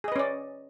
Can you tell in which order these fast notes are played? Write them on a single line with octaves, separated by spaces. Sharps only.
G#4 D#5 B4 C#4 D5